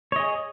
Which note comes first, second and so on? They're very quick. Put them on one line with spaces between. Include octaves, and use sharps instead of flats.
C#5 D#5 G#4